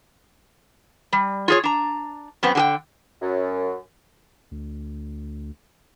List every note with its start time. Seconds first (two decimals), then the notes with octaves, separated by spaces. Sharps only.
1.13 G3
1.48 F4 G#4 C#5
1.63 D4 A#5
2.43 F#2 B3 C4
2.55 D3 G#4 G5
3.21 F#2
4.51 D2